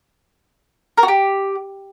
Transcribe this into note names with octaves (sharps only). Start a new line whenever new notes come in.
A#4
F#4
G4